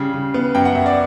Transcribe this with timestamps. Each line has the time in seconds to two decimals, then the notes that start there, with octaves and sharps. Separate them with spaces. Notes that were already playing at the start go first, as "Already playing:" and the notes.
Already playing: C#3 G3
0.14 C#3
0.34 B3
0.55 F#2 G5
0.65 F#5
0.75 F#2 E5
0.86 D5